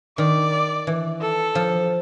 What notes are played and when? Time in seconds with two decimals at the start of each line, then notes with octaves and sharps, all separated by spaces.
0.18 D#3 D5
0.87 E3
1.21 A4
1.55 F3